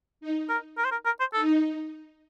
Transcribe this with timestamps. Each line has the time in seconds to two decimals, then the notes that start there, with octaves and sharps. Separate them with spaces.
0.21 D#4
0.49 A#4
0.78 A#4
0.85 C5
0.92 A#4
1.06 A#4
1.20 C5
1.33 D#4 A4